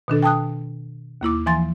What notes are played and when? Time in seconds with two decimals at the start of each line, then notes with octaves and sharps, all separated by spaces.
0.08 B2 D#3 D4 A4
0.23 G5 A5 D#6 F#6
1.21 D#2 A#3 E4 D6
1.46 E3 F3 G#5 C6 A6